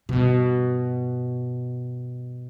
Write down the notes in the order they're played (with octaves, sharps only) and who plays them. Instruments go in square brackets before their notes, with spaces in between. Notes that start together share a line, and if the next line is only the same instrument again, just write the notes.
[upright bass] G2 B2